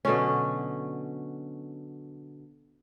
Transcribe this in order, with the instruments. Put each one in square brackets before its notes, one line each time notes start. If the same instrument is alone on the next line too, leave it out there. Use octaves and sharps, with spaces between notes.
[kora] B2 D3 F#3 C#4